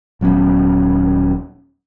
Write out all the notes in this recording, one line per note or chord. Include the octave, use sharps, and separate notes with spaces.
D#1 F#3 B3 C#4